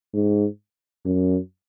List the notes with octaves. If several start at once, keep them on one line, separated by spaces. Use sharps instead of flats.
G#2
F#2